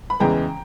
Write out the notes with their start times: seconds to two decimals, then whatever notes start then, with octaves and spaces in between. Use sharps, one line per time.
0.10 B5
0.20 E2 C#3 E3 G#3 G5 A#5